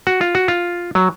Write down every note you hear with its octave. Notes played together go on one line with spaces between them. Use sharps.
F#4
F4
F#4
F4
F#3